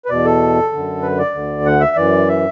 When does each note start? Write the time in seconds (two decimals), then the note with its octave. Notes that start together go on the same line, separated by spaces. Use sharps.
0.05 B4
0.09 E2 B2 D5
0.25 A4
0.72 F#2 D3
1.02 B4
1.18 D5
1.34 D2 D3
1.66 F#5
1.80 E5
1.96 F#2 E3 D5
2.28 E5